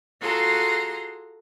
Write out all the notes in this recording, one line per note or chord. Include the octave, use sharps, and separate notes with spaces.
F4 F#4 G#4 A4 A#5 C6